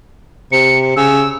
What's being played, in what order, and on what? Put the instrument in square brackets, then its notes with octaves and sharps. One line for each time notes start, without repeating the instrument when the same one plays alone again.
[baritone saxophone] C3 [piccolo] C#7
[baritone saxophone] C#3 [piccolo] E6